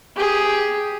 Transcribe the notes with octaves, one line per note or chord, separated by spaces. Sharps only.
G4 G#4